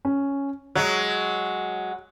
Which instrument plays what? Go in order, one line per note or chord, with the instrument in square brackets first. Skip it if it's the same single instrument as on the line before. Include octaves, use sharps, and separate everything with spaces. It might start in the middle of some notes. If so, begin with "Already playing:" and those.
[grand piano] C#4
[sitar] F#3 G#3 [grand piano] F#6